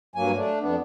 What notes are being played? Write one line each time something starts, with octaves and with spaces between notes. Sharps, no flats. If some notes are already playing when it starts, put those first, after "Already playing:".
G2 F#3 A#3 G#5
A3 D4
F2 B3 D4